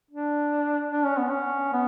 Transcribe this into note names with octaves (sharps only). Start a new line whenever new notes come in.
D4
D4
C#4
B3
C#4
B3